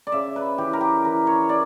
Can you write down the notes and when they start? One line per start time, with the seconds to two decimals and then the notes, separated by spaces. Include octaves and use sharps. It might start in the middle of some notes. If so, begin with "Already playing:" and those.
0.07 D5
0.12 C#3 E5
0.36 B4
0.58 E3 G4
0.73 A#4
0.81 G4
1.04 E3 A#4
1.27 C#5
1.49 D5